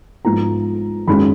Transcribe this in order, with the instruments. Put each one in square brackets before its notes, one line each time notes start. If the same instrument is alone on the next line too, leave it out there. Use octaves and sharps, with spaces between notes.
[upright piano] G#2 F3 B3 A#5
F#2 D#3 G#3 C#4 B5